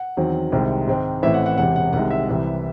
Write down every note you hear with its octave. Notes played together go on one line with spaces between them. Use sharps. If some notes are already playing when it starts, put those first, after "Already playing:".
Already playing: F#5
E2 D#3 F#3 C4
C2 C3 D#3 G#3 C4
G#2 D#3 G#3 C4
A1 A2 E3 C4 E5
F#5
F#5
E1 E2 C3 F#5
F#5
C2 C3 D#3 G#3 F#5
E5
C2 C3 E3